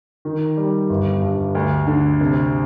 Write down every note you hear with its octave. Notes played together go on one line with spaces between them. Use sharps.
D#3
G3
G1
G2
D2
D3
C3